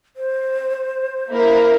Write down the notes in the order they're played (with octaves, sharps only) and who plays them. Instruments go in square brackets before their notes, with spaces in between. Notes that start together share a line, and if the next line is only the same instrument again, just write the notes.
[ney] C5
[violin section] A#3 E4 A#4